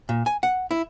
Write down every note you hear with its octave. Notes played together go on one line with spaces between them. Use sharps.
A#2
G#5
F#5
E4